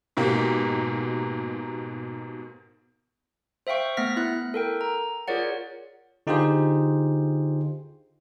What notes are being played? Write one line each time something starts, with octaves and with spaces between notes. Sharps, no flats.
G#2 B2 A#3 G4
C5 E5 F5 G5 C#6
A3 B3 F6 A#6 B6
B3 E4 F#6
A4 A#4 G5
A#5
F4 G#4 A#4 C#5 D5 F#5
D3 D#4 F4 G4 G#4 C5